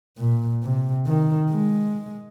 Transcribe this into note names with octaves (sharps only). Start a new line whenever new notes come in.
A#2
C3
D#3
G#3